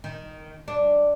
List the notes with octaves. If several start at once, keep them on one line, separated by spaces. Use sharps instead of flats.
D#3
D4